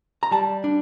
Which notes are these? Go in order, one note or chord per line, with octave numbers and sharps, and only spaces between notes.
A#5
G3 A5
D4